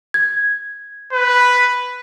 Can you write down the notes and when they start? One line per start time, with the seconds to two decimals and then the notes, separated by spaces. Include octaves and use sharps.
0.14 G#6
1.13 B4